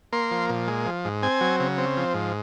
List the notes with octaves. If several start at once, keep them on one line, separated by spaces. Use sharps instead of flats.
A#3 C6
F3
A#2
G#3
F3
G#2
C4 G#5
F#3
C#3
C4
F3
G#2